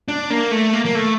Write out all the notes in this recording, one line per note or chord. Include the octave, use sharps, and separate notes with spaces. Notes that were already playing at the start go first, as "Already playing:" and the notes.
D4
A#3
A3
A#3
A#3
A3